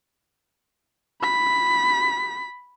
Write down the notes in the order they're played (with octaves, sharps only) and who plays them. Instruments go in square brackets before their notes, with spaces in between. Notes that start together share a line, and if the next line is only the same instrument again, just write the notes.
[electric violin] B5 B6